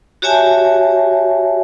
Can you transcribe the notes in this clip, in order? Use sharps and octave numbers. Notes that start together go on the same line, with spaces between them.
F#4 G4 C#5 E5 G#5 A5